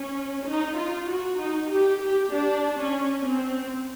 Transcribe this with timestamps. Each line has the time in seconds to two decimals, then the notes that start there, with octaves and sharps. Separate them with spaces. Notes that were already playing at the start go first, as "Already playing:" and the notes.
Already playing: C#4
0.47 D#4
0.78 F4
1.09 F#4
1.40 D#4
1.71 G4
2.02 G4
2.34 D4
2.81 C#4
3.27 C4